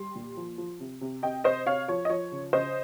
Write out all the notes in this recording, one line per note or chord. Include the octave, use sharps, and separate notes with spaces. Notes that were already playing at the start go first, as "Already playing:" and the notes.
Already playing: G3 C6
A#2
F3
F3
C3
C3
C3 D#5 G5
C3 C5 D#5
C3 C#5 F5
F3 C#5
D#5
F3 C#5
C#3
C#3 C5 D#5